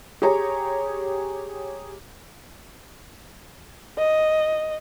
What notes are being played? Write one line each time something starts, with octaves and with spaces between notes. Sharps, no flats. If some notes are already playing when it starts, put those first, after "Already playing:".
G4 G#4 C#5 A#5
D#5